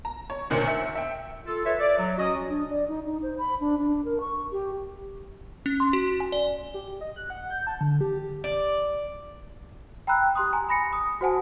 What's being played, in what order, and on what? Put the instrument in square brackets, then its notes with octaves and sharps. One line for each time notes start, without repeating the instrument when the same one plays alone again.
[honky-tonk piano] A#5
C#5
D2 A#2 D#3 C5 C#5 C#7
E5 C#7
E5 G5
[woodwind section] F4 A4
F4 A4 B4 C#5 E5
D5
F#3
F#3 C#4 F#4 D#5
[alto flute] D4
D5
D#4
D#4
C5
B5
D4
D4
A#4
C#6
G4
[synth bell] C#4
C6
F#4
G#5
D5
[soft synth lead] G4
D#5
F#6
F#5
G6
A5
D3
G4
[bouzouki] D5
[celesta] G5 A#5 B5 E6 F#6
G4 C6 D#6
G#5 A#5
B5 A#6 C#7
D#6
F#4 C5 F#5 G#5 A5